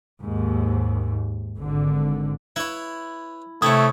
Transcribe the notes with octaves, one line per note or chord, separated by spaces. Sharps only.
D#2 G#2
G#1 D3
E4 B4 C#5
C3 A3 E4 C#5 G5 D#6